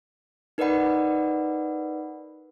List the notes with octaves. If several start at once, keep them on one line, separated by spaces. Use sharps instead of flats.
D#4 A#4 B4 D5 F#5 B5